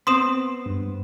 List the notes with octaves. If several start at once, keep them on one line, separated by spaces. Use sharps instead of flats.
B3 C4 C6 D#6 E7
G2